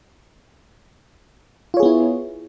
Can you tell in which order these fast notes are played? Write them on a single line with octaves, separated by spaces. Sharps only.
F4 C#5 G#4 B3 E4